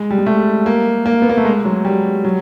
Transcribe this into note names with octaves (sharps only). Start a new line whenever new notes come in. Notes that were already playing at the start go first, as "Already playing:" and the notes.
Already playing: G#3
G3
G#3
A3
A#3
A#3
B3
A#3
A3
G#3
F#3
G3
F#3